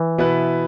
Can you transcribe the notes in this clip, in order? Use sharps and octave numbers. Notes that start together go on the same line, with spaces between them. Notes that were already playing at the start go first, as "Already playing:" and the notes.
Already playing: E3
B2 B3 E4 B4